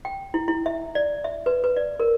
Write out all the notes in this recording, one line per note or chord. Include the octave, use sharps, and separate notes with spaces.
G5
E4
E4
E5
D5
E5
B4
B4
D5
A#4